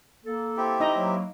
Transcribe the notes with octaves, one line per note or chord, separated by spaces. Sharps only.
A#3 A4
C4 E4 G4
D#4 D#5 A#5
F#3 A#3